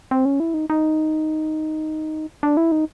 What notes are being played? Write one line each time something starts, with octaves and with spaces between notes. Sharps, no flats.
C4
C#4
E4
D#4
D#4
D4
E4
D#4